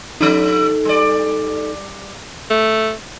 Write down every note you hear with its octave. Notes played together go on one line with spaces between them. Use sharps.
F3 C#4 D#4 A4
G3 D5
A3